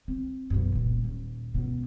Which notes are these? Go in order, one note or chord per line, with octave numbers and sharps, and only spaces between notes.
C4
B1 F#2
E1 A#2
D#1
C#2 B2